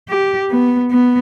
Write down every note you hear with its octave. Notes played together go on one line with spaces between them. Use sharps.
G4
B3
B3